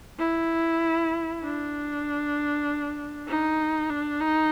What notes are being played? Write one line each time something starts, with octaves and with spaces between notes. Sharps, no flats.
E4
D4
D#4
D4
D#4